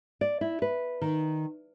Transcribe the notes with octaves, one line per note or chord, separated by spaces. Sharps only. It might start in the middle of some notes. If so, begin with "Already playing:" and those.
D5
E4
B4
D#3